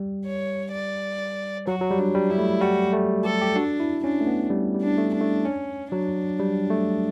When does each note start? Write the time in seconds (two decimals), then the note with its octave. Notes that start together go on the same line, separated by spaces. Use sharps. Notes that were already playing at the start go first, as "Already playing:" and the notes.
Already playing: G3
0.26 C#5
0.72 D5
1.67 F#3 F#4
1.81 F#3
1.91 G3
1.99 D4
2.14 G3
2.30 E4
2.39 A3
2.61 G3 F#4
2.93 A3
3.25 G4 A4
3.42 G4
3.56 D4 F#4
3.80 E4
4.04 C#4 D4
4.21 A3
4.27 B3
4.50 G3
4.75 G3
4.82 D4
4.98 A3
5.14 D4
5.21 A3
5.45 C#4
5.91 F#3 D4
6.40 G3
6.70 A3